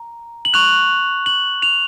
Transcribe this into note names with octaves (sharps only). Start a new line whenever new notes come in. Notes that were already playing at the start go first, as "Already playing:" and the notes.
Already playing: A#5
F#7
C#6 F#6 F7
F#7
F7